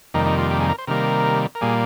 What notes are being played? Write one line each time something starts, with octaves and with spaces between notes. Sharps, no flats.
F2 C3 D#3 G3 A#3 D#4
D#4
F4
G4
G#4
A#4
C5
C3 D#3 G3 A#3 A#4
A#4
A#2 G3 A#3 G#4